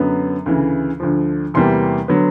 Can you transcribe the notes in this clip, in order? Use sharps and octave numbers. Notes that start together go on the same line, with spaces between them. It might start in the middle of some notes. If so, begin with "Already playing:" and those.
Already playing: F#2 D3 F#3 B3
D2 C#3 E3
D2 D3 F3
E2 C3 E3 G3 A#3 C6
D3 F#3 B3